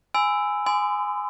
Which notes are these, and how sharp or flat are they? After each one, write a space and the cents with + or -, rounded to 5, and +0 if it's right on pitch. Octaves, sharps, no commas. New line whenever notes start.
G#5 +0 B5 +40 E6 +0
G#5 +0 C6 -40 D#6 -30